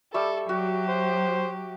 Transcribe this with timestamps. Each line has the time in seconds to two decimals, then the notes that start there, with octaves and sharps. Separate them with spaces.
0.14 G3 A4 E5 C#6
0.49 F#3 F#4 G4
0.88 C5